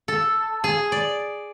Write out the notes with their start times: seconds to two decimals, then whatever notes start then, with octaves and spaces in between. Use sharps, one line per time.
0.08 A4
0.64 G#4
0.92 D5